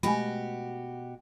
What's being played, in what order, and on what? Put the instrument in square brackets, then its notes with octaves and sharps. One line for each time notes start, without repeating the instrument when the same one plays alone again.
[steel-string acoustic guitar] B2 F#4 G4 [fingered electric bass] G#3 A3 [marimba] G#5 B5